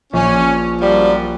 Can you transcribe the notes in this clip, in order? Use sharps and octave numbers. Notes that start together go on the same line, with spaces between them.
A#1 C#4 C#7
F#2 F3 G3